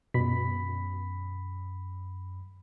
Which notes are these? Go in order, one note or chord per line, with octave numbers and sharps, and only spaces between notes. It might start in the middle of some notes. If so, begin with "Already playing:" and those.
F#2 B2 B5 B6